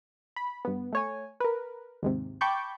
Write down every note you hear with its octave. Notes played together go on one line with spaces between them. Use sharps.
B5
G2 B3
A3 C#5 G#5
A#4 B4
D#2 G#2 C3
G5 A5 B5 C#6 D6 G6